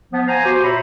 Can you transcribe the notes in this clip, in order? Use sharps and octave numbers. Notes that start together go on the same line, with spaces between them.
F3 B3
C5 F5 G#5 A#5
F#4 G4 C5
A#2 C#5 E5 A#5 B5